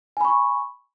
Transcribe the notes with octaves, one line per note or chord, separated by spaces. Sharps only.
G#5 B5 C#6